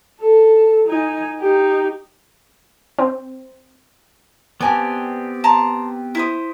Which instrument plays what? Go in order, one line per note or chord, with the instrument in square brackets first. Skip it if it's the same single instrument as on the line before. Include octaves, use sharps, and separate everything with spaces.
[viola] A4
D#4 G#5
D#4 G4
[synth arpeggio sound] C4
[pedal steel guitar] B3 C4 G4 [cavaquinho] D5 G#5 A5
[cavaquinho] A5 A#5 C6
E4 C5 D#6